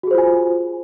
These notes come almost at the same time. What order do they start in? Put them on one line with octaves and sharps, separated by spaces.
F#4 G#4 C5 F4 G#5